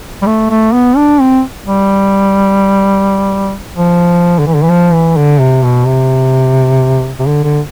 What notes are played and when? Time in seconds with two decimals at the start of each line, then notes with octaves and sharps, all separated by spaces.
0.22 G3
0.27 A3
0.50 A3
0.73 B3
0.97 D4
1.21 C4
1.67 G3
3.77 F3
4.39 D3
4.47 E3
4.55 D3
4.63 E3
4.70 F3
4.94 E3
5.17 D3
5.40 C3
5.63 B2
5.86 C3
7.19 C3
7.26 D3
7.44 D3